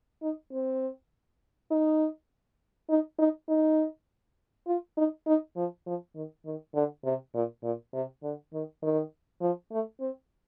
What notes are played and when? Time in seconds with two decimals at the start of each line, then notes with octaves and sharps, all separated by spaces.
0.22 D#4
0.52 C4
1.71 D#4
2.89 D#4
3.18 D#4
3.48 D#4
4.67 F4
4.97 D#4
5.26 D#4
5.56 F3
5.86 F3
6.15 D#3
6.45 D#3
6.74 D3
7.04 C3
7.34 A#2
7.63 A#2
7.93 C3
8.23 D3
8.53 D#3
8.82 D#3
9.41 F3
9.72 A3
10.00 C4